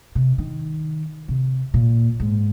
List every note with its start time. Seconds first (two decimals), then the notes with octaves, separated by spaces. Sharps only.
0.15 C3
0.38 D#3
1.28 C3
1.74 A#2
2.20 G#2